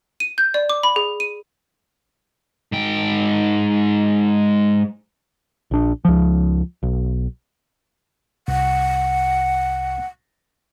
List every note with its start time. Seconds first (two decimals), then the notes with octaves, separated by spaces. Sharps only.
0.20 D#7
0.38 G6
0.54 D5
0.69 D6
0.83 B5
0.96 G#4
1.20 D#7
2.72 G#2 G5
5.71 A#1 D4
6.05 C#2 F3
6.83 B1
8.48 C2 F#5